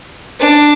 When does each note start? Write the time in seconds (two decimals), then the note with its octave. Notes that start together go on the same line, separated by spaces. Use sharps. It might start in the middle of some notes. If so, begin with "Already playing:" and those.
0.40 D4